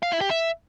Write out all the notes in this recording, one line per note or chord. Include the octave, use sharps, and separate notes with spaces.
F5
E4
G4
E5